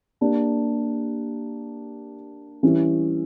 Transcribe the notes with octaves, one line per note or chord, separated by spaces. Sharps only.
A#3 D4 G4
E3 G3 C#4 E4